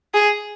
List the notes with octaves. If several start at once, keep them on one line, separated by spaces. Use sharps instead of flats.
G#4